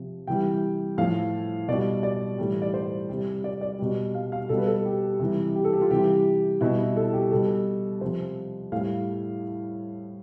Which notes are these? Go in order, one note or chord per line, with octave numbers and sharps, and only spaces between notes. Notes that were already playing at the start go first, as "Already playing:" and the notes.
Already playing: C3 F3
C3 E3 G3 G5
A2 F3 F5
B2 G3 D5
D5
A2 E3 G3
D5
C5
C3 G3
D5
D5
B2 G3
F5
F5
B2 G3 A4
B4
A4
G4
C3 E3 G3
G4
A4
G4
F4
C3 E3 G3 G4
B2 G3 E4
E4
A4
G4
B2 G3 A4
C3 F3 C5
A2 G3 F5